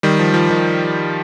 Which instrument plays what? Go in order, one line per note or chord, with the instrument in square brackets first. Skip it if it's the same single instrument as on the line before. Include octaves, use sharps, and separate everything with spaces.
[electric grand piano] D#3 G3
F3
F3
D#3